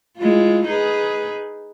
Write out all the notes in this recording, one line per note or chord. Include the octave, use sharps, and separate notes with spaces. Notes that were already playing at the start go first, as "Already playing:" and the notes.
G#3 E4 F4
D#4 G#4 B4